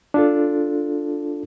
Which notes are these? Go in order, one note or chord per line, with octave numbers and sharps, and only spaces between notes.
D4 F4 A4